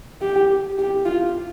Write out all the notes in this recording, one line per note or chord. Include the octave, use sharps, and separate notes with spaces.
G4
G4
F4